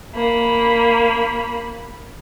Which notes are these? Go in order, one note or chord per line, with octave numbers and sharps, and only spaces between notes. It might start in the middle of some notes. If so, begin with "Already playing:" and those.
A#3 B5